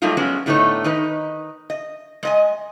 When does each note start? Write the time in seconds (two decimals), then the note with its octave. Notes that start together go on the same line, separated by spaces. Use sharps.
0.02 F#3 G3 A3 A#3 D#4 F4
0.17 F#3 G#3 B3 C#4
0.46 A2 D3 A3 B3 D#4 C#5
0.84 D#3 D#4 B4
1.70 D#5
2.23 G#3 D#5 G#5